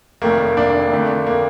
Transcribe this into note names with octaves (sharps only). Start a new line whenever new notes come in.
F1 F2 D#3 A3 A#3
A#3 D4
F2 D3 A3
A#3